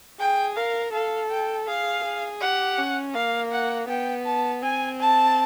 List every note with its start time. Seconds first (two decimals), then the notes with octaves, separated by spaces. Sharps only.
0.20 G#4 G5
0.57 A#4 F5
0.93 A4 F5
1.31 G5
1.67 G#4 F5
2.05 G#4
2.41 G4 F#5
2.78 C#4
3.15 A#3 F5
3.52 F#5
3.89 B3 G5
4.25 A5
4.62 C4 G#5
5.00 A5